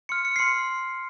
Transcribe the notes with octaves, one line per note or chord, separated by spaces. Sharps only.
C6 F6 C#7
C#7
C7
C6 F6 C#7